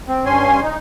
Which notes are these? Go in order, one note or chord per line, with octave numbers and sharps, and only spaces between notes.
C4
G2 C#4 G#5 C6
D#4